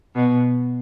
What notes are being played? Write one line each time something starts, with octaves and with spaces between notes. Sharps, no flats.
B2